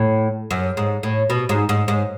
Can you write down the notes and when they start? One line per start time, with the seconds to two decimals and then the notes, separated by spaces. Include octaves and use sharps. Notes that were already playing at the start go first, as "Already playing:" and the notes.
Already playing: A2
0.51 F#2
0.77 G#2
1.03 A2
1.30 B2
1.49 G#2
1.69 G#2
1.88 G#2